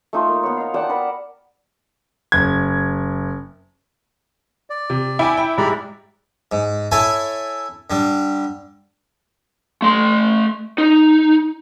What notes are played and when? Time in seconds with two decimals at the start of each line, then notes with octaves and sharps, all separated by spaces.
0.13 A3 D#4 F4 A4
0.29 A#3
0.43 B3 C#5
0.57 D#4 F5
0.74 D5 F#5 G5 A5
0.89 A#4 B4 F#5 A5
2.32 F#1 G#6
4.70 D5
4.90 C3
5.19 E4 G5 G#5 D6
5.37 G5
5.58 G#2 G3 G#3 D5 A#5 B5
6.52 G#2
6.92 E4 A4 C#5 G#5
7.90 D3 G3
9.82 A3 C6
10.78 D#4